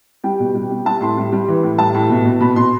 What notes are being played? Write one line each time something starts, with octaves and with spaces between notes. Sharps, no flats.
G3 G5
B2
G3
G3
G3 A5
A2 C6
G3
G3
E3
A2
G3 A5
A2
B2
B2
B2 B5
B2 C6